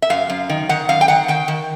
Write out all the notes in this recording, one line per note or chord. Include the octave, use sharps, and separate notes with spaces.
E5
F#2 F5
F#2
D#3
D#3 F#5
F#2 F5
G5
D#3 F#5
D#3 G5
D#3